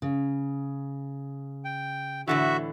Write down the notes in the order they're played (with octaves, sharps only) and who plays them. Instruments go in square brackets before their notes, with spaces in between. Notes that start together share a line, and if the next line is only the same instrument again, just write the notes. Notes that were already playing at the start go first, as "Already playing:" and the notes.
[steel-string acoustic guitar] C#3
[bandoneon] G5
[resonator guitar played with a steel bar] A2 D3 E3 [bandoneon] F#4 E5